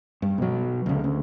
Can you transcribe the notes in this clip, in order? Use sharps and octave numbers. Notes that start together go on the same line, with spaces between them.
G2
B2 F#3
D2 C#3
D2